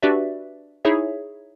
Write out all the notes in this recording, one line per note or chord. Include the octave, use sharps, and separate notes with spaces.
D4 F#4 G4 B4 D5 E5
D#4 E4 G#4 C#5 E5